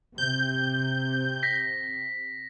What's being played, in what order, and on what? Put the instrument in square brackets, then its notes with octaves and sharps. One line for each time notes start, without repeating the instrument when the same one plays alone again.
[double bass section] C3 [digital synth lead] G6
[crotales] A#6 B6